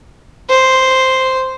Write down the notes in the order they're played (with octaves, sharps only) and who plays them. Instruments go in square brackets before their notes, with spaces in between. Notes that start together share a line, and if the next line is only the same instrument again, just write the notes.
[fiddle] C5